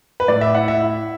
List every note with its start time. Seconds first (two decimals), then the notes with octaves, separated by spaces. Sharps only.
0.20 B4
0.28 A2 D5
0.41 E5
0.55 E4 F#5
0.68 E5
0.81 E4